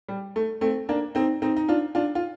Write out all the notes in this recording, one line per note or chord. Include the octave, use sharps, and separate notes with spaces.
G3
A3
A3 C4
A#3 D4
C4 D#4
C4 D#4
D#4
D4 F4
D4 F4
F4